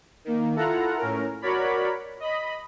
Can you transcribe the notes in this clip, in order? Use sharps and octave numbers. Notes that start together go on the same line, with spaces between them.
D#3 A#3
E4 F4 A4 F#5 A#5
A2 C#4 A#4
F#4 A#4 C#5 D5 B5
D#5 B5